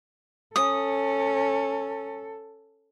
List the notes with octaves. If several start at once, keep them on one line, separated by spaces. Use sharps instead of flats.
C#4 A4 D#6